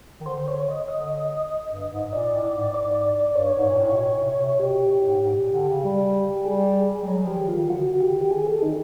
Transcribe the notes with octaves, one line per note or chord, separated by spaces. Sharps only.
D#3
D3 C5
C#5
D#5
D3 D#5
G2
G#2
A#2 D5
A2
G#2
G#2 D5
G2 C#5
G#2
A#2
A2
B2
A#2
C3
C3
B2 G4
A#2
A2
G#2
G#2
A#2
D3
C#3
G3 G4
G3 G#4
G3
F#3
F3 G4
D#3
F4
D#3
D3 F#4
C#3
D#3
D3 G4
D#3
G4
D#3 G#4
E3 A4
D#3 D#4